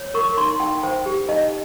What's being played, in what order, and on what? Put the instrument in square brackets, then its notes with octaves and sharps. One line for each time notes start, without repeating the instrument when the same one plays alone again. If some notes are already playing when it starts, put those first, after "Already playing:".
Already playing: [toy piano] C#5
A#4 C#6
D#4 C6
D#4 G5
C5 G5
G4
D#4 D#5